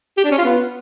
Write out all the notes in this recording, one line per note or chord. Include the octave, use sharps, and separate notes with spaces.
G4
D4
C#4
F4
B3